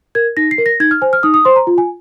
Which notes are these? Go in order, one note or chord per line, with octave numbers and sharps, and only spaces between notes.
A#4 G#6
D#4 A#6
C7
A#4
A#6
D#4 G#6
F6
C5 G#5
F6
D#4 D#6
D#6
C5 C6
A#5
F4
G#5